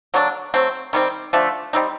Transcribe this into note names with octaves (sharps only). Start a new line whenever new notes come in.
D3 F#3 A#3 D4
F#3 A3 C4
D#3 G3 C4
D3 F3 A3
G3 C4 D#4